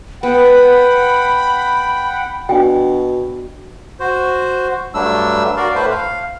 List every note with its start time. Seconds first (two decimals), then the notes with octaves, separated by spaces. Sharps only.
0.23 B3 F#5 G5 B5
2.49 B2 D4 F#4 G5 G#5
4.00 F#4 C5
4.94 G2 F#3 G3 A3 D4 E6
5.57 F#4 A#4 D5 F5
5.75 A2 A3 B4 C5
5.91 F5